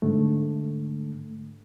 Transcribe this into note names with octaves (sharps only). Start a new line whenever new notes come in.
G#2 D3 A3